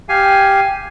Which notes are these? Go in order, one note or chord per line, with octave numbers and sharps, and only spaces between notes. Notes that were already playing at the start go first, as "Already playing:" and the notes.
G4 F5 G#5